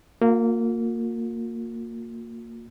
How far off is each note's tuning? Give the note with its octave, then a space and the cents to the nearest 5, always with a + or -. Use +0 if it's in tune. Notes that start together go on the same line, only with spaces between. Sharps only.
A#3 -15 F4 +45